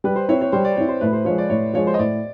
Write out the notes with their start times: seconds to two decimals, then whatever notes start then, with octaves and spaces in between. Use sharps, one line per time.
0.04 G3 B4
0.16 C5
0.29 C4 E4 C#5
0.41 C#5
0.52 G3 C5
0.65 D5
0.77 C4 E4 C#5
0.88 C5
1.01 A2 B4
1.13 C5
1.25 F3 C#5
1.30 G#3
1.38 D5
1.49 A2 C#5
1.74 F3 G#3 C#5
1.87 C5
1.94 D#5
1.98 A2 D5